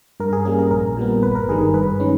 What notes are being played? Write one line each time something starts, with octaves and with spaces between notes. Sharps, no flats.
G2 A#4
G#4
G3 A#3 C#4 G#4
A#4
A#1 A#4
A#2 G3 B3
G1 B4
A#4
G2 D#3 G3 G#4
A#4
G2 B4
D#3 G#3 C#4